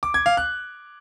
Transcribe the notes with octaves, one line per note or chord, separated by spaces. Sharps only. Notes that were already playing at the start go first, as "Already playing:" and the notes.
D6
G#6
F5
F#6